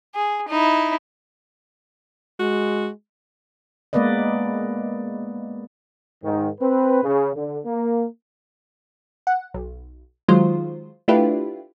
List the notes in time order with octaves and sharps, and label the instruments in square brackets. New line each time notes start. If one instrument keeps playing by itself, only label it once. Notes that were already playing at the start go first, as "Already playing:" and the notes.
[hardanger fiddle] G#4
D#4 E4
[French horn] G#3 [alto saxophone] F#4
[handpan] G#3 A#3 B3 B4 D5 D#5
[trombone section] G#2 D#3
C4 B4
C#3
D3
A#3
[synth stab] F#5
B1
D#3 F#3 G#3 F4 C5
A3 D4 E4 F4 G4 B4